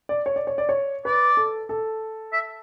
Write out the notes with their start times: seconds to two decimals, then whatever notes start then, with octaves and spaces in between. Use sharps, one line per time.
0.09 D5
0.26 C#5
0.36 D5
0.47 C#5
0.58 D5
0.69 C#5
1.05 B4 D5
1.37 A4
1.69 A4
2.33 E5